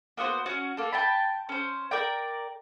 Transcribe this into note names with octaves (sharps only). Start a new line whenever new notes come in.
A#3 B3 F#4 C5
C#4 F#4
A#3 A4
G5 A5 B5
C#4 C5
A#4 D5 G5